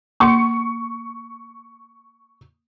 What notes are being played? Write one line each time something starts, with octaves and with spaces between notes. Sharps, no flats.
A#3 C6 C#6 C#7